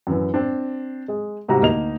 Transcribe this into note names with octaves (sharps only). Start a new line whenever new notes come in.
F#2 E3
C4 D4
G#3 G#4
G#2 C3 G3 F#4 A#5
D2 A#3 D#4 F7